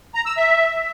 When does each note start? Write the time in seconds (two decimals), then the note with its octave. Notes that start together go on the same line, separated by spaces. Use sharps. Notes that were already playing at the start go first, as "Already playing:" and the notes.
0.14 A#5
0.26 E6
0.37 E5